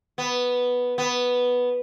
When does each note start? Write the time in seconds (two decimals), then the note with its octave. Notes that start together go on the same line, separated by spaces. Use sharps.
0.18 B3
0.98 B3